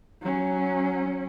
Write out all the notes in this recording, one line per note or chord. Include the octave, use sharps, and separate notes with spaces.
F#3 C#4